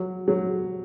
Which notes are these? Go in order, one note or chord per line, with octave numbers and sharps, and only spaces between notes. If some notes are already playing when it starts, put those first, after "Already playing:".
Already playing: F#3
F#3